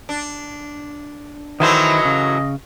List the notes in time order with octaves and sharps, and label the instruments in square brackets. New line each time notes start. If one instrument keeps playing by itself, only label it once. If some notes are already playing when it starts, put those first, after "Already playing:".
[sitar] D4
[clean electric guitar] D#3 E4 C5 [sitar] E3 F#3 A3 [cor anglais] D#5
[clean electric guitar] C#3